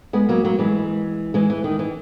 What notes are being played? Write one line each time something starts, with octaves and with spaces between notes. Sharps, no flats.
G#3 B3
F#3 A#3
F#3 A#3
E3 G#3
E3 G#3
E3
D#3
E3